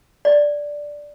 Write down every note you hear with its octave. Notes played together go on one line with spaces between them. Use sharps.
D5